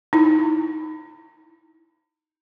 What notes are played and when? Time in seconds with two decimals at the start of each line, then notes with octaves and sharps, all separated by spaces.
0.13 D#4 E4